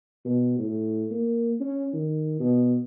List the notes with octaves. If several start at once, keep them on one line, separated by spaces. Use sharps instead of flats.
B2
A2
A#3
C#4
D#3
B2